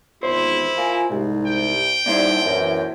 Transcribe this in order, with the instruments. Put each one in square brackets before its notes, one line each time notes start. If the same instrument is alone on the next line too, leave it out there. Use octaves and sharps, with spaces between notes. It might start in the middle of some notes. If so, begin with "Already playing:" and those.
[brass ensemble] G#1 E2 F4 [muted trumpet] E4 [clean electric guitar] C5
[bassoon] A#3 [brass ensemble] F4 G#5
[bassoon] C2 [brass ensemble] G#2 C3
[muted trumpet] G5
[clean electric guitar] A#2 E4 C5 [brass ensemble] G3 D#4 D5
[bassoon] F#2 [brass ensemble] E3